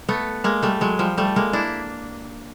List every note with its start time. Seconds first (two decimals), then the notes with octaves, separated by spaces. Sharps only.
0.09 A3 B3
0.44 G#3 A#3
0.62 G3 A3
0.81 F#3 G#3
0.99 F3 G3
1.18 G3 A3
1.36 G#3 A#3
1.53 D4 E4